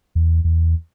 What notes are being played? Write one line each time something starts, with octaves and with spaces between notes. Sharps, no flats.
E2
E2